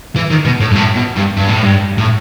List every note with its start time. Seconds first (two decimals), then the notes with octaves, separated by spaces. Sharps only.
0.16 E3
0.30 D#3
0.45 B2
0.60 A2
0.71 G2
0.76 A2
0.96 B2
1.17 G2
1.37 G2
1.49 A2
1.63 G2
1.98 A2